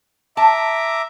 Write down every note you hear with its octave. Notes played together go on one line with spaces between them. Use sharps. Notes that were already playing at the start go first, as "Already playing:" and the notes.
E5 A5 A#5 D6